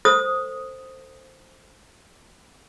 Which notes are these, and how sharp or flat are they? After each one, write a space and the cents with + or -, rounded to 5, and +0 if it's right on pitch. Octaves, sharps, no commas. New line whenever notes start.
A4 +25 C5 +0 D#6 +0